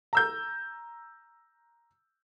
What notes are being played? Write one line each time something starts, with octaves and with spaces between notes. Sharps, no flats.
A#5 E6 G6